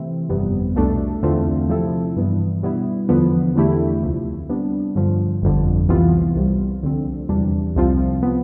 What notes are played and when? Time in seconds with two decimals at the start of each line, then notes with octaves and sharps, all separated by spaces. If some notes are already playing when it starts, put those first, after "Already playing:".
Already playing: C3 E3 A3 C4 E4
0.29 G1 F2 C3 G3 B3
0.76 C2 B2 A3 D4 A4
1.23 E2 D3 A3 C4 F4
1.69 C3 F3 C4 E4 A4
2.16 G2 E3 B3 D4
2.63 B2 G3 B3 E4
3.09 E2 D3 F3 B3
3.56 E2 D3 A3 E4 G4
4.03 D2 C3 F3
4.49 C3 G3 B3 D4
4.95 G2 D3 F3
5.42 G1 F2 D3
5.89 C2 C3 E3 B3 F4
6.36 C2 C3 G3
6.83 D2 D3 F3 C4
7.29 E2 C3 G3 D4
7.76 C2 C3 F3 C4 F4
8.23 F3 B3